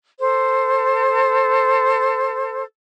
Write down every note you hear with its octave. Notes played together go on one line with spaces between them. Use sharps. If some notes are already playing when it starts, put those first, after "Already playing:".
A4 C5